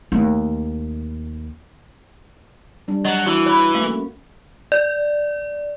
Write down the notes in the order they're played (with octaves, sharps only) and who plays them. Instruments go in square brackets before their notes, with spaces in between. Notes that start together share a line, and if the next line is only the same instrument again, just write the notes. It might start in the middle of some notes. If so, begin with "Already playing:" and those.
[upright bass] D#2 A3
[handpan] G3 D4
[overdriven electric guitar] F#3 [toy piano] D#5 [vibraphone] F#5
[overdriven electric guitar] E3 [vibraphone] E4 [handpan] F#4 [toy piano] C#6
[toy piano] C#5 B5
[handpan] A3 A#3 [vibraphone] C#4 [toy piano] F5
[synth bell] D5